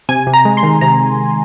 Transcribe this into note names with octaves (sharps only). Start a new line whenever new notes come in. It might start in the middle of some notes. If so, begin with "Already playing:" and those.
C3 G#5
C3
A#5
G#3
C6
D#3
C3 A#5